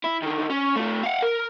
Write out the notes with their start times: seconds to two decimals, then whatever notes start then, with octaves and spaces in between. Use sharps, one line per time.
0.04 E4
0.22 D3 D#3
0.50 C#4
0.76 A3 F4
1.03 F5 F#5
1.22 A#4